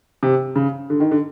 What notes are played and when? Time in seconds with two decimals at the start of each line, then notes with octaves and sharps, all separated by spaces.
0.23 C3
0.56 C#3
0.90 D3
1.00 D#3
1.11 D3